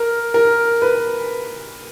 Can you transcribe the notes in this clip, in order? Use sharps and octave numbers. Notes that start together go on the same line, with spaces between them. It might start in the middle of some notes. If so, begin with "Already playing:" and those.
Already playing: A#4
A#4
B4